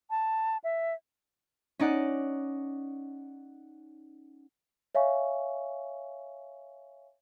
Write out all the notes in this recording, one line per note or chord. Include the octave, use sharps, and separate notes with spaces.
A5
E5
C#4 D#4 D5 F#5
C#5 E5 F5 G#5 C#6